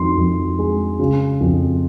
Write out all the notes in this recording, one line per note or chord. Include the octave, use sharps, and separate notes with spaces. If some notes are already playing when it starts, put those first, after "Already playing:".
Already playing: F2 D#3 C6
F2
G#3
C#3
F2